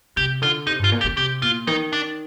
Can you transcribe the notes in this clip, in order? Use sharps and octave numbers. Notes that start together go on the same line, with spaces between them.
C3 G4
D3 F4
C3 D#4
G2
F4
A#2
G4
D3
C3 G4
A#2 F4
D#3 D#4
D4